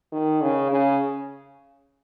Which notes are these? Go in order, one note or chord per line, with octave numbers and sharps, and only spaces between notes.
D#3
C#3
C#3